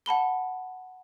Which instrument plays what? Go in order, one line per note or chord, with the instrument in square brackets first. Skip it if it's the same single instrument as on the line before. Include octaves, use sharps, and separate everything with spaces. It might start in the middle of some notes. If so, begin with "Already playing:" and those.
[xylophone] F#5 A5 B5 G7